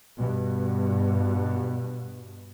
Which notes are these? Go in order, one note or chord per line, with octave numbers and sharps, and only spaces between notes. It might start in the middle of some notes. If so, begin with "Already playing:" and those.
G2 B2